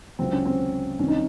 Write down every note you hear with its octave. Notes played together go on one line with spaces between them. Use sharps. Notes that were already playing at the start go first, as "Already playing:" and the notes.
C#2 C3 F#3 C4
C#4
C4
C2 C3 D#3 C#4
D#4